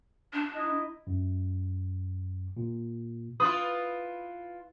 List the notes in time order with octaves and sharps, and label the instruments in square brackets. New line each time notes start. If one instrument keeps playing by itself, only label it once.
[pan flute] D4
[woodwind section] D#4 E4 D#5
[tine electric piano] F#2
A#2
[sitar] E4 F4 B4 [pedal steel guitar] D#6